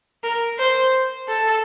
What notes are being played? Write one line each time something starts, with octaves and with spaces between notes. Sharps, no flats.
A#4
C5
A4